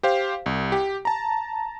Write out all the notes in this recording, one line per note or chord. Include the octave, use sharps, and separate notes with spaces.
G4 C5 F5
C2
G4
A5 A#5